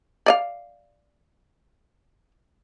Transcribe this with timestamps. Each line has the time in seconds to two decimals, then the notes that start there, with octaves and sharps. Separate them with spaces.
0.26 D5 D#5 F5